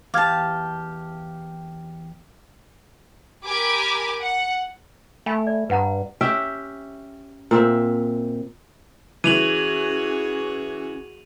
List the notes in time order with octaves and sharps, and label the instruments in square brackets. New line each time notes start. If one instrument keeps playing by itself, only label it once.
[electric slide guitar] E2 G4 [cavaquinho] F5 A5 [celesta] D6 F6 G#6
[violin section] G4 A#4 G#5 B5 D6
F#5
[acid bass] A3 [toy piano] E5 G#5 B5
[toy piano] D5
[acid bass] G2 [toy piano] B4 F#5 A#5
[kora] C#4 G4 E5 G5
A#2 C4 E5
[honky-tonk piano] E3 [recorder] C#4 [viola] F#4 G#4 [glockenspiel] D#7 F7 F#7